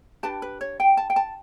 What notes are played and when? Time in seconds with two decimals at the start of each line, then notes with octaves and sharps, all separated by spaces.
0.23 D4 G4 B4 A5
0.42 B4
0.61 C#5
0.80 G5
0.97 A5
1.10 G5
1.16 A5